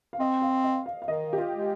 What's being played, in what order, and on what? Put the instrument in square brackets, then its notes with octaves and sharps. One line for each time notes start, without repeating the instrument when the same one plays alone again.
[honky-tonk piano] F5
[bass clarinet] C4 [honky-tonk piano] D#5
[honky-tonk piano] F5
D#5
F5
F5
[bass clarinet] D#3 [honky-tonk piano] D#5
[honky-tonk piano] G4
F4
[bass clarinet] G#3